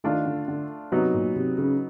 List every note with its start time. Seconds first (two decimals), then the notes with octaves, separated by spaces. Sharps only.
0.04 D#3 A3 D4 F4
0.26 D3
0.48 D3
0.92 C3 F#3 B3 D#4
1.14 A#2
1.36 C3
1.58 C#3